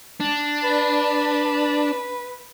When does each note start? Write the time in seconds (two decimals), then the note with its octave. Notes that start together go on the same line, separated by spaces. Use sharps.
0.20 D4
0.64 B4